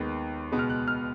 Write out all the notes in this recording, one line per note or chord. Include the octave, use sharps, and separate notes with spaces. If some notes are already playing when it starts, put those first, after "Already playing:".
Already playing: D#2 D#3 G#3 B3 D#4
C#2 B2 G#3 B3
F6
F#6
F6